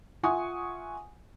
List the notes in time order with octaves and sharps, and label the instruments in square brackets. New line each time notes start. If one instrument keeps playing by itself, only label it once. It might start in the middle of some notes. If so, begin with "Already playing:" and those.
[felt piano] F4 E5 F#5 G#5 C#6 D#6